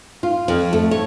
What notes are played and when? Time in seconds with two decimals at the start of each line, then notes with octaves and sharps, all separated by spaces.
0.23 F4
0.48 F2
0.73 A3
0.91 C#5